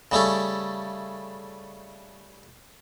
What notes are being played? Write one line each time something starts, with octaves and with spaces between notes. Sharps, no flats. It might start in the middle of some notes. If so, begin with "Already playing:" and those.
C#3 G3 A3 C#4